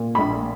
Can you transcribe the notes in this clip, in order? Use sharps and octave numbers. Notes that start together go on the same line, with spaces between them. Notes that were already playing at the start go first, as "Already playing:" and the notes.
Already playing: A#2
A#1 B5